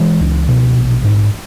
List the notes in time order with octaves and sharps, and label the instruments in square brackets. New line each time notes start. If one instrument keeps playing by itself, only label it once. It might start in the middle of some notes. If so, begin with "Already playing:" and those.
Already playing: [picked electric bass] E3 G#3
C#2
B2
A#1
G#2